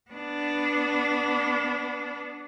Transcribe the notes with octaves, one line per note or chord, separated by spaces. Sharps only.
B3 D4